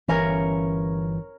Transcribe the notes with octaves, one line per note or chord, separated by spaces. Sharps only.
G1 E3 C#4 A#4 C#5